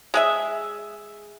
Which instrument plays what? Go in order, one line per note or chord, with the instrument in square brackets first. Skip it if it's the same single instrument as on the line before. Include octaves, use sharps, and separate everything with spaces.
[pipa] G#3 G#4 E5